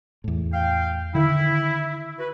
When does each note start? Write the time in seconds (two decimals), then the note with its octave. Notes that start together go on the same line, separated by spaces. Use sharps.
0.24 E2 A2
0.53 F5 G5
1.15 D3 D#3 E4
2.19 F#4 B4